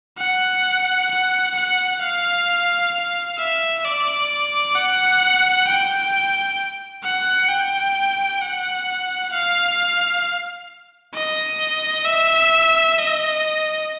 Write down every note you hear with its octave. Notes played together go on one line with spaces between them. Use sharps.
F#5
F#5
F#5
F5
E5
D5
F#5
G5
F#5
G5
F#5
F5
D#5
E5
D#5